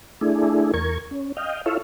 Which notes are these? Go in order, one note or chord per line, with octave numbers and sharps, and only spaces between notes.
A3 D4 E4 G#4
E2 A#4 C#6 G#6
C#4
D#5 F5 G5
E4 F4 A4 C#5 E5 F5